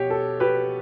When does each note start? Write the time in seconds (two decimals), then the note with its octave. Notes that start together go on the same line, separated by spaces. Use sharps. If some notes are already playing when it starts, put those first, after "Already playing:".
Already playing: B2 G4 C#5
0.10 A4
0.40 G4 B4